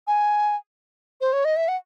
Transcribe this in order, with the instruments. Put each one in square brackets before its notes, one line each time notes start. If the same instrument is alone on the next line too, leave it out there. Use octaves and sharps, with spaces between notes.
[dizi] G#5
C5
C#5
D#5
E5
F#5